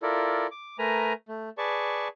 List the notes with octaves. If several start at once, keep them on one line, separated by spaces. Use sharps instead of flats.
E4 F4 A4 A#4 D5
D6
A3 A#4 B4 G#5 A#5
A3
G#4 B4 D5 A5 C#6